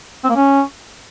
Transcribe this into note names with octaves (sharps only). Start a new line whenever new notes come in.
C4
A#3
C#4